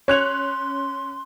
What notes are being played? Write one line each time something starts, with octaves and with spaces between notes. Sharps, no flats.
C#4 C#5 C6 F#6 F7